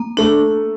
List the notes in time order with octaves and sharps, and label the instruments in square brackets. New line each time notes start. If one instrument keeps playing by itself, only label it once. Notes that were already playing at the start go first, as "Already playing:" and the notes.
Already playing: [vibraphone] A#3
[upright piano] A3 [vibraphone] D4